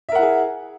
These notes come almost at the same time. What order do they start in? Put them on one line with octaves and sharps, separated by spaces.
E5 A#4 F#5 E4 G#4